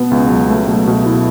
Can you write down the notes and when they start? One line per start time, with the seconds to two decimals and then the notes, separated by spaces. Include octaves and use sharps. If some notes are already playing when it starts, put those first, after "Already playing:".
Already playing: B2 B3
0.11 C#2
0.30 F#3
0.49 A3
0.68 B2
0.87 B2
1.06 E4